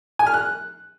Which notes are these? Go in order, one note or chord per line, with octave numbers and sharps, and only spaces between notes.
G#5
F6
F#6